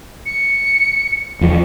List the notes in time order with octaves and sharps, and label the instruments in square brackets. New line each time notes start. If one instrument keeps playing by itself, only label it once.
[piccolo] C#7
[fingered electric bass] E2 F3